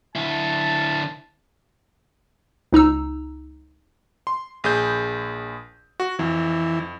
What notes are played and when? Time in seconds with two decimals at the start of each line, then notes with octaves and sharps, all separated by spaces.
0.16 D3 E4 A5
2.73 C#2 D#4 A#5 E6
4.27 C6
4.64 A#1 G#4 G6
6.00 F#4
6.19 F2 E3